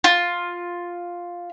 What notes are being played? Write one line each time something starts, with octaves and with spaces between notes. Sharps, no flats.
F4